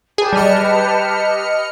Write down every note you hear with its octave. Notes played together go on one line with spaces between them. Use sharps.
G4 G#4 B4 A5
G3 D#5 F6 C#7